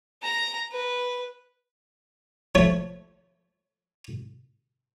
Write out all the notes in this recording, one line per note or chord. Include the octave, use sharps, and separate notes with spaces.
A#5
B4
F3 A3 C#5